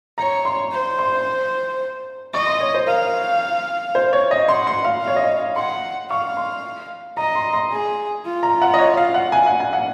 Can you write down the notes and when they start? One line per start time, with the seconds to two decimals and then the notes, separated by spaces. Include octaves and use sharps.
0.18 C#5 A#5
0.45 C6
0.72 C5
0.99 C6
2.33 D#5 C#6
2.47 C6
2.60 C#5
2.74 C5
2.87 A#4 F5
3.95 C5
4.13 C#5
4.31 D#5
4.48 F#5 C6
4.67 C6
4.85 F5
5.02 F5
5.07 C#5
5.16 D#5
5.56 F#5 C6
6.09 F5 C#6
6.37 C6
7.17 D#5 A#5
7.35 C6
7.53 C6
7.71 G#4
8.25 F4
8.43 A#5
8.62 F#5
8.74 D#5
8.79 C#5
8.97 F5
9.14 F#5
9.32 G#5
9.46 F#5
9.60 G#5
9.73 F#5